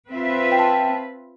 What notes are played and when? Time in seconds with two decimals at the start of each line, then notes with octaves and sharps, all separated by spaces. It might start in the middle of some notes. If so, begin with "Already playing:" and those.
0.10 C4 F4 B4 E5
0.52 G5
0.59 A5